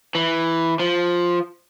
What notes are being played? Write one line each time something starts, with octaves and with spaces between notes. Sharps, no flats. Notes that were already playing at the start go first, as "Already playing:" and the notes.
E3
F3